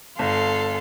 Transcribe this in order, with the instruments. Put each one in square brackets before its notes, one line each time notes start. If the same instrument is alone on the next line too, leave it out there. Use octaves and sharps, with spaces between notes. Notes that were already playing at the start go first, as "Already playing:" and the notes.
[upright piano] G1 [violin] A4 C6 [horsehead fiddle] F5